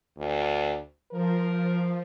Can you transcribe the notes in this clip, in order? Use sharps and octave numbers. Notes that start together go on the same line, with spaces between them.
D2
F3 A#4